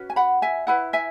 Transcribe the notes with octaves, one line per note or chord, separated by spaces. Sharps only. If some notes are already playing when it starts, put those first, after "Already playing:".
Already playing: C#4 F#4 B4
G#5
F#5 B5
E5 G#5
E4 B4 F#5 B5
E5 G#5